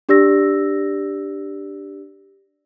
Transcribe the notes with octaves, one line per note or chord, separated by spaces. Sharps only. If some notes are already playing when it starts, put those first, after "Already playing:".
D4 G4 D5 E6 A#6